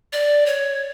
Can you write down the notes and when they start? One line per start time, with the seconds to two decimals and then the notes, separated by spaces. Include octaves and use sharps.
0.13 D5
0.46 C#5